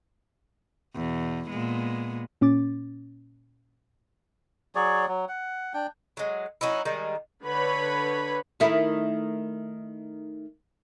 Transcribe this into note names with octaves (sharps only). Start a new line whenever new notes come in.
E2 B2
A#2 G#3 B3
A#2 C#4 D6 A6
F#3 G#4 C#5 D5
F#3
F#5
D4 G5
F#3 G#3
F#3 C#4 D#4 E4
D#3 G3 G#3 D#4
D3 B4 C#5 B5
D#3 A3 E4